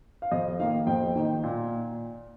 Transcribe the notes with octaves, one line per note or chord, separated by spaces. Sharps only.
F5
F2 D#5
D#3 A#3 D#4 F5
F2 G5
D#3 A#3 D#4
A#2